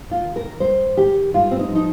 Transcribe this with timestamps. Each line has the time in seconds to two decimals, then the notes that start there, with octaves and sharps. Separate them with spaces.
0.11 F4
0.24 D#3
0.36 A#4
0.60 G2 C5
0.97 D#3 G4
1.34 G2 F4
1.51 C4
1.59 D#4
1.72 F3 D#4